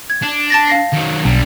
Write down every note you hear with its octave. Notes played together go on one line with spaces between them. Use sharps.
G#6
D4
A5 A6 A#6
F5 A#6 C7
D#3 F#3
B1 D3 G3